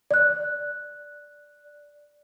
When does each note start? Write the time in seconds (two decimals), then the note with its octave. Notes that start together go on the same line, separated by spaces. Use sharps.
0.11 D5 F#6